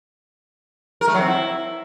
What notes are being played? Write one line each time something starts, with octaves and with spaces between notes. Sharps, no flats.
A#4
A3
F#3
C4
E4